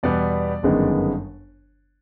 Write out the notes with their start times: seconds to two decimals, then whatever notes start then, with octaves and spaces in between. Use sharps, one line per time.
0.03 E2 B2 G3 B3 D5
0.63 G1 F#2 D#3 G#3 B3